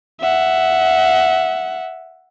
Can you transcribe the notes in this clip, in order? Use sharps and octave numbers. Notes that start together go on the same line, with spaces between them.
E5 F#5